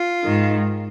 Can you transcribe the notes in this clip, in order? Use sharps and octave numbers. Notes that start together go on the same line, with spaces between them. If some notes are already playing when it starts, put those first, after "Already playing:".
Already playing: F4
G#2 D#3